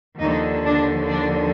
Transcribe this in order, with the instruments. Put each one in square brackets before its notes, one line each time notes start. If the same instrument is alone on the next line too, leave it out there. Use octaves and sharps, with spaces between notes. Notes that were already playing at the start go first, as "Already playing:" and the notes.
[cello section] D#2 D3 F3 D#4
D4
D4